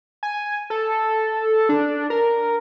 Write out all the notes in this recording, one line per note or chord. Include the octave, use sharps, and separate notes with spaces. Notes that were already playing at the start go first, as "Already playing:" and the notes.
G#5
A4
D4
A#4